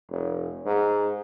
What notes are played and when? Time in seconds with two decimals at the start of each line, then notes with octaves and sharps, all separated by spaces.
0.10 F1
0.66 G#2